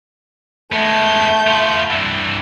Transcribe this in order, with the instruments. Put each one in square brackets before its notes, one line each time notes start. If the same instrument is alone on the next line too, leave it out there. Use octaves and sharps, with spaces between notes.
[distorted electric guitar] G#3 B3 [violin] A3 G6
[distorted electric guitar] B3 F4
G2 E3